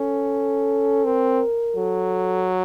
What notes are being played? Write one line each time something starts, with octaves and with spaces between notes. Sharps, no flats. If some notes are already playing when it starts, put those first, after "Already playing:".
Already playing: C#4 A4
C4 A#4
F#3 A4